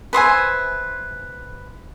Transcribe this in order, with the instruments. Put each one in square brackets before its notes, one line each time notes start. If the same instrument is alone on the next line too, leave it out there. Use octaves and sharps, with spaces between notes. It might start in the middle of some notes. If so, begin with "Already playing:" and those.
[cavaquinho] B4 C5 E5 G#5